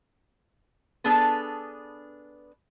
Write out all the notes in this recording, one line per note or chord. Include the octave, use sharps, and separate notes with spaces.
B3 D4 G#4 A4 B4